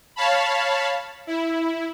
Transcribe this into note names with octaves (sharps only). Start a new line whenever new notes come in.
C#5 F5 A5 B5
E4